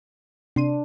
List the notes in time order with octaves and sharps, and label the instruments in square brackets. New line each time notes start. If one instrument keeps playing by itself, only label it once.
[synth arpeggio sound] C3 C6 D#7 [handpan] D4